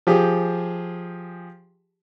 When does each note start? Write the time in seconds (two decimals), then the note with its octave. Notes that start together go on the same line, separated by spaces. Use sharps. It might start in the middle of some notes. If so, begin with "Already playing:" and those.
0.07 F3 G4 G#4